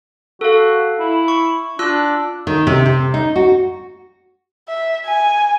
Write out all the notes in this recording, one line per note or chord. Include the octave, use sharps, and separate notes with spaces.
F#4 A4 F5
E4
C#6
D4 F4 E6 F#6
D#3
C3
C3
D#4
F#4
E5
G#5